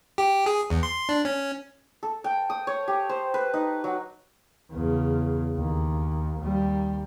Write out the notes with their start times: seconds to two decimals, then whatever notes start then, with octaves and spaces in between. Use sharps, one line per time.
0.18 G4
0.46 G#4
0.70 E2
0.83 C6
1.09 D4
1.25 C#4
2.03 A4
2.24 G5
2.50 D#6
2.67 C#5
2.88 G4
3.09 C5
3.34 B4
3.54 D#4
3.84 F#3
4.71 E2 C#3
5.56 D#2
6.40 D#2 G3